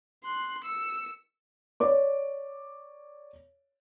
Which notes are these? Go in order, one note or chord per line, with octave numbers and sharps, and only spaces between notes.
C6 F#6
E6 C#7
C#5 D5 D6